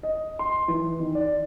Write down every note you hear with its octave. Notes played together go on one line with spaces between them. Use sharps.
D#5
C6
E3
D#3
D5